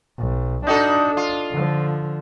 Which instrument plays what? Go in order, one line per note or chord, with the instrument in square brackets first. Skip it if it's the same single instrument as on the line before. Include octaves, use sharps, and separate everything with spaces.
[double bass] B1
[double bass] D4 [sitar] D#4 F#4 A4
[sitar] F4
[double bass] D3 F3